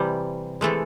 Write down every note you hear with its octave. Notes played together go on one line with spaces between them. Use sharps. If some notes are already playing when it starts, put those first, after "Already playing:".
Already playing: C3 E3 G3
C3 E3 G#3 A3 A4